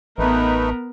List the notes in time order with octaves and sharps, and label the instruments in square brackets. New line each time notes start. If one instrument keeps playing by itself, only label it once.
[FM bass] A1 [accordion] A3 D#4 B4 [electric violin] B3 A#4